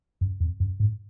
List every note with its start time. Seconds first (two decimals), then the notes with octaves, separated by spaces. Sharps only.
0.21 F#2
0.40 F2
0.60 F#2
0.80 G#2